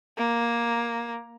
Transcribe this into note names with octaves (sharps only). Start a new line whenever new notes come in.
A#3